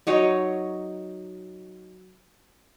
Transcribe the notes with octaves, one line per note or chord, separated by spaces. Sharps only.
F#3 D#4 C#5 D#5